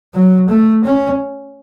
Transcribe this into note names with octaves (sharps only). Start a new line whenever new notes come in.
F#3
A3
C#4